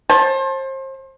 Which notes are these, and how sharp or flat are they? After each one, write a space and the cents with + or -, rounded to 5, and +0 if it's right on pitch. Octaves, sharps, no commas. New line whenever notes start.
C5 +35 A5 +0